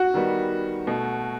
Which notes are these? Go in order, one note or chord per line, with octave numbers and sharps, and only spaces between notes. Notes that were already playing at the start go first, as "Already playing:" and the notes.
Already playing: F#4
D#3 G3 B3
B2 A3